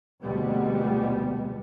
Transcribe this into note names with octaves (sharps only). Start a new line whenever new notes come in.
F1 D2 B2 G3 G#3 B3